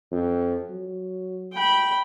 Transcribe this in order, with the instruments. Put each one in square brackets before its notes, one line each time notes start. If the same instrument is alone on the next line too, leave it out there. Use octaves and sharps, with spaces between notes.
[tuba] F2
F#3
[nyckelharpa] G5 B5